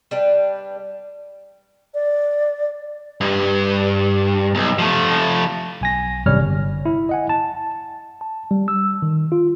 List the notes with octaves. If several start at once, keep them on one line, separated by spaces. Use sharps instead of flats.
G3 D4 B4
D5
G2
B1
F3 A3
B1 G#5 A#6
G#1 F#2 C3 G3 C#5 F6
G1
E4
D#5 F#5 G#5
A5
A5
G3
E6
D#3
F4